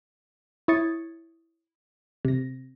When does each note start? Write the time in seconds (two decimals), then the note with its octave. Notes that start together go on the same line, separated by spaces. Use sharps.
0.68 E4 C#5 D#6 G#6 A6 C#7
2.25 C3 A#6